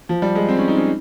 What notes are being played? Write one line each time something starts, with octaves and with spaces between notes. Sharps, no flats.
F3
G3
G#3
C4
C#4
D#4
C#4